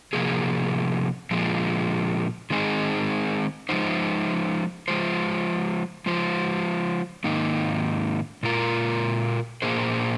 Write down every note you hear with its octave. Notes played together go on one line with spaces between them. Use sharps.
C3 F3 A#3 G#4
A#2 F3 G#3
D#3 G#3 C4 D#4 G#4
F3 G#3 D#4 C5
F3 G#3 F4 C5
F3 G#3 F4 C5
G#2 D#3 A#3 D#4
A#2 G#3 F4 A#4
A#2 A#3 G#4 C5